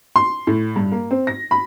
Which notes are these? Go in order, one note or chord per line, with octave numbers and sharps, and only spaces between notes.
C6
A2
G2
A#3
C4
A#6
B5